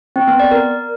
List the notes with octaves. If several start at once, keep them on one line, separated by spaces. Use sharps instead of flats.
C4
B3
D5
A#4